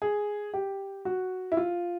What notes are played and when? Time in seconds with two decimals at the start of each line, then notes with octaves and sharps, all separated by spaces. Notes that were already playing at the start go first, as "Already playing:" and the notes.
0.02 G#4
0.54 G4
1.05 F#4
1.52 E4
1.57 F4